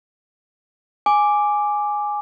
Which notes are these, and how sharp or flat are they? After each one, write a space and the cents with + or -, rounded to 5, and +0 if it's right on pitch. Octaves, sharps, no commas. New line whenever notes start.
G#5 +0 D6 +0